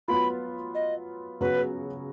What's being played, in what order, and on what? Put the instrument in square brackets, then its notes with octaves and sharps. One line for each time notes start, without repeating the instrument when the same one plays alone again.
[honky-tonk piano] F#3 B3 F4 [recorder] B5
[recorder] D#5
[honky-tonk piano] C#3 F#3 B3 F#4 [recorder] B4